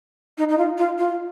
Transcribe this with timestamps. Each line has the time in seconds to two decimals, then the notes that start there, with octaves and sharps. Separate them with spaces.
0.37 D#4
0.48 D#4
0.58 F4
0.77 F4
0.98 F4